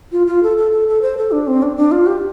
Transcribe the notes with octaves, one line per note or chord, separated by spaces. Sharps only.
F4
F4
A4
A4
A4
A4
C5
A4
D4
C4
D4
D4
F4
G4